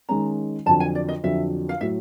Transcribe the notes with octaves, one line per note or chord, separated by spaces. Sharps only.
D#3 G#3 C#4 A#5
F2 D3 F#3 A5
G#5
D5
D#5
F2 D3 F#3 E5
F5
A2 F#3 E5